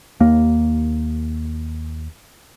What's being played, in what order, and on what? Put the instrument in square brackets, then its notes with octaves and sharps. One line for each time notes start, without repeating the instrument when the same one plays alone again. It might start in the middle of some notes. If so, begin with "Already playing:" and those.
[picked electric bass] D#2 A#3